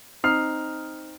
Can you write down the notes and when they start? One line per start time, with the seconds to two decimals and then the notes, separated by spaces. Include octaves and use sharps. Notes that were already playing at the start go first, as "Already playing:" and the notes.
0.24 C4 D#4 D#6 F6 C7